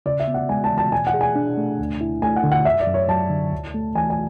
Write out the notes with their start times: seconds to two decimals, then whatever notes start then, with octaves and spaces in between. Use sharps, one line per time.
0.06 C#3 D5
0.20 E5
0.28 B3
0.34 F#5
0.49 G#3 G#5
0.64 A5
0.71 E3
0.78 A5
0.92 B2 G#5
1.07 F#5
1.14 G#4
1.21 G#5
1.36 D4
1.57 A3
1.79 D2
2.01 E4
2.22 A3 G#5
2.36 F#5
2.44 D3
2.52 F#5
2.65 F#2 E5
2.80 D5
2.87 F#2
2.94 C#5
3.08 F#3 A5
3.30 D3
3.52 D2
3.74 A3
3.95 E3 G#5
4.10 G#5